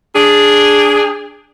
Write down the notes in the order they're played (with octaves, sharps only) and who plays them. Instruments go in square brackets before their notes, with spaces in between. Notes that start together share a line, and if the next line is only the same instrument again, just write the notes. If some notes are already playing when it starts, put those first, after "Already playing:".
[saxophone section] D4 G#4